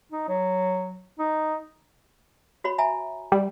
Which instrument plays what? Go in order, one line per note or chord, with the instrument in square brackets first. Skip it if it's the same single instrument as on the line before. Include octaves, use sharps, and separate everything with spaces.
[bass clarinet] D#4
F#3
D#4
[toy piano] F#4 C#5 B5
E5 G#5 A#5
[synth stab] G3